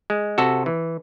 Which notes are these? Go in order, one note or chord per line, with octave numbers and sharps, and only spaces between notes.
G#3
C3 F#4 A4
E3